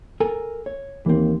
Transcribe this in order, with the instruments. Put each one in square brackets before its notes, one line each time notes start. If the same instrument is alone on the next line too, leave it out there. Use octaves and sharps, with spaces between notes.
[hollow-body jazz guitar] A4 A#4 G#5
C#5
[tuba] D#2 [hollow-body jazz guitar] E3 C4